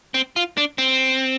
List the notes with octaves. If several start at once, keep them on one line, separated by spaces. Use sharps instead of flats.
C4
F4
D4
C4